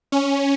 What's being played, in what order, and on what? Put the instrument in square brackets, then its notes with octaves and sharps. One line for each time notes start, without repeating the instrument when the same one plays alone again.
[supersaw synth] C#4